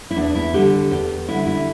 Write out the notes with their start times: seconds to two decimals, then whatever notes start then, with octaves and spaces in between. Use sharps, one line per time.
0.11 E4
0.16 E2 D4
0.35 E4
0.54 D3 G3 G4
0.91 E2 G4
1.29 D3 G3 E4
1.47 E4